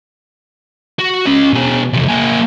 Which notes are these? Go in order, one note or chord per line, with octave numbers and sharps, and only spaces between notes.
F#4
C#4 D#5
B2 G#4
E2 C3
A#3 G#4